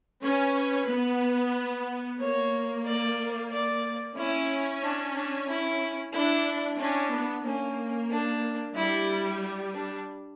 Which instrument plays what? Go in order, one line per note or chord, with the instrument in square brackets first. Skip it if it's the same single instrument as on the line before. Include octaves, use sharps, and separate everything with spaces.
[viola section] C#4 [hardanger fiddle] B4
[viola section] B3
[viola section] A#3 [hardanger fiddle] C#5
[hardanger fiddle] D5
D5
[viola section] C#4 [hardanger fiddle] E4
[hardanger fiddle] D4
D4
E4
[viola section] D4 [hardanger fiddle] E4
[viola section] C#4 [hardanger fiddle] D4
[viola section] B3
[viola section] A#3 [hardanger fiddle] C#4
[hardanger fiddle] D4
[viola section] G3 [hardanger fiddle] E4
[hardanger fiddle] D4